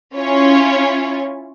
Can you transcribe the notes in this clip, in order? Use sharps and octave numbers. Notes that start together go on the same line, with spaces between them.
C#4 E4 F4 C#5